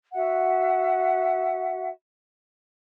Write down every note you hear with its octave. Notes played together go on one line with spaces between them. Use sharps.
F#4 E5 F#5